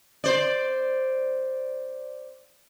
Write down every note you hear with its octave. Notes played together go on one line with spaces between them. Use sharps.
C5 D5